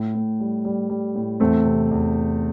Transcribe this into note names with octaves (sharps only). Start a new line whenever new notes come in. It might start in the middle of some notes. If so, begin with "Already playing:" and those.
Already playing: A2
A2
G3
G3
G3
A2
E2 A3 C4
C3
E2